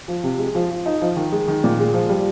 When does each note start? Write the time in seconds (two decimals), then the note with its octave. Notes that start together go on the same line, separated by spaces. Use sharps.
0.08 F3
0.23 C3
0.39 G#3
0.55 F3
0.71 F3
0.86 D#4
1.02 F3
1.16 D#3
1.32 G#3
1.48 D#3
1.64 A#2
1.79 G#3
1.94 F3
2.10 G3